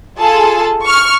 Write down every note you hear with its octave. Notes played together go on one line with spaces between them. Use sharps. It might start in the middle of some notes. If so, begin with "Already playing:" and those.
F4 G#4 A4 A5
C#6 F6